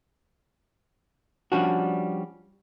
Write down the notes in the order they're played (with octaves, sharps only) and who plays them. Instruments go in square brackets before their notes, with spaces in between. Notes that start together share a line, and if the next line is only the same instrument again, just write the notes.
[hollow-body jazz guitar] F3 G3 C#4 D4 F#4